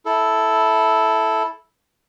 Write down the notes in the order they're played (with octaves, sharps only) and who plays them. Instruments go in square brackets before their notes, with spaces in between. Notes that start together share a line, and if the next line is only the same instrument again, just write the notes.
[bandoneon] E4 A4